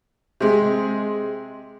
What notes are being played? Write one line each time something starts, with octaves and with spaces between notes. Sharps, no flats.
C3 G#3